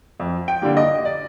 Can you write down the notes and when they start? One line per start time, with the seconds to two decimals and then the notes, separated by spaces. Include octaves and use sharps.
0.20 F2
0.48 G5
0.62 D3 G3 A#3
0.77 D#5
1.05 D5